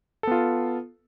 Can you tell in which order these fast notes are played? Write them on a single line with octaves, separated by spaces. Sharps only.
A4 B3 F4